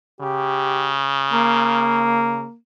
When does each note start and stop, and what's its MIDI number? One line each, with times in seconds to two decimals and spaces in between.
0.21 2.46 49
0.21 0.92 67
1.33 2.55 58